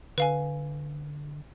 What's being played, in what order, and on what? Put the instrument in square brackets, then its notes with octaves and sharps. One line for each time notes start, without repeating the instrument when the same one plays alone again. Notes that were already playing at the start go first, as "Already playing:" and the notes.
[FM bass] D3 [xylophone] B4 F5 G#5